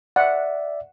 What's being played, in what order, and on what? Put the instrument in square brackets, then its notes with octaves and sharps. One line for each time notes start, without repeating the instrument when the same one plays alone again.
[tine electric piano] D5 E5 [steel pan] F#5